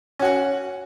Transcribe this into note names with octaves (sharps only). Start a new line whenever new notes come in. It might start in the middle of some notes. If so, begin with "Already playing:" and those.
C#4 F#4 F#5